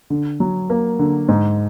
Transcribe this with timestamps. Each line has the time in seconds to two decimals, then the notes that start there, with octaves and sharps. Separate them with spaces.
0.10 D3
0.40 F#3
0.70 A#3
0.99 D3
1.28 G#2